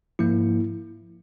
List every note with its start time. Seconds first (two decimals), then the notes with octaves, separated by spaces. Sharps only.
0.19 G#2 F3 A#3 E4